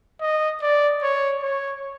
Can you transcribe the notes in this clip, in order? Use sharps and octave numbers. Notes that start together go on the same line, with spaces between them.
D#5
D5
C#5
C#5